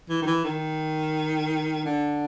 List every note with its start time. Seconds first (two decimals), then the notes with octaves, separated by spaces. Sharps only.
0.09 E3
0.21 D#3
0.26 E3
0.44 D#3
1.85 D3